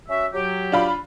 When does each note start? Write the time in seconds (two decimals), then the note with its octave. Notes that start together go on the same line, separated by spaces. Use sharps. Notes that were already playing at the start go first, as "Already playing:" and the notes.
0.08 C#4 F#4 E5
0.33 F#3 G4
0.72 D4 F4 B5